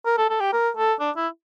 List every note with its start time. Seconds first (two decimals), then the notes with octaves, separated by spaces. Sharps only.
0.06 A#4
0.18 A4
0.30 A4
0.40 G4
0.53 A#4
0.77 A4
1.00 D4
1.16 E4